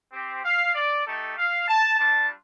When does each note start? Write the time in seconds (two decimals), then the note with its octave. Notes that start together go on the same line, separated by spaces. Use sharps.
0.13 C4 G4
0.44 F5
0.75 D5
1.06 A3 D#4 G4 A4
1.37 F5
1.68 A5
1.99 G3 D4 F4 A5